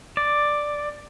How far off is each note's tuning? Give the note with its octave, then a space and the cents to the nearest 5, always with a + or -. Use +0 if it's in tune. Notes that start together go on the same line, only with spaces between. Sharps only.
D5 +5